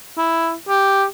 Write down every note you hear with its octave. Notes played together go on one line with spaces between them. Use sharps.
E4
G4